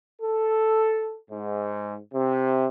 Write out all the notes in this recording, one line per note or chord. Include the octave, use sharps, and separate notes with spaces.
A4
G#2
C3